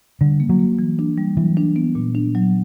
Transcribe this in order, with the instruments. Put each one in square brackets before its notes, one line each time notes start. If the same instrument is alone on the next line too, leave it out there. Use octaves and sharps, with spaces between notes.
[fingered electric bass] D3 [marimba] G3
[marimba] A#3
[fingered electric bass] F#3
[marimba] A#3
E3
D4
G3
[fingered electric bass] E3 [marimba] F#3
[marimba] D4
B3
A#2
D4
F#3